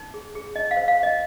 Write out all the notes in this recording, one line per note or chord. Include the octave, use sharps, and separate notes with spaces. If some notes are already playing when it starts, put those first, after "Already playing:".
Already playing: D#4
G#4
G#4
D#4 D#5
F5
C5
F5
C5
D#5